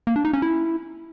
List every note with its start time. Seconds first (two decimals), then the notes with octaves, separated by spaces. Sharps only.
0.07 A#3
0.16 D4
0.25 D#4
0.33 C#4
0.42 E4